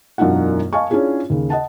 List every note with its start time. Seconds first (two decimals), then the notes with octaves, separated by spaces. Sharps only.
0.18 E1 F#2 D4 D#4 F4 F#5
0.73 D#5 F5 G#5 A5 C#6
0.90 C#4 D4 E4 F4 G#4 C#5
1.30 D#2 C#3
1.50 D#5 F#5 A5